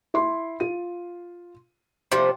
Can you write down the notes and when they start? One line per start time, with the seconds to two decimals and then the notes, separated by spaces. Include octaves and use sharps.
0.14 E4 C6
0.60 F4 D#7
2.12 C3 F3 G3 C6